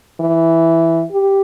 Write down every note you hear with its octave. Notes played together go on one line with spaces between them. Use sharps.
E3
G4